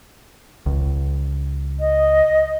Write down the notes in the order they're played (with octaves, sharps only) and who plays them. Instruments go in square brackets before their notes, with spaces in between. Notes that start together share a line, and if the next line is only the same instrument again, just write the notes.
[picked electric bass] C#2
[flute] D#5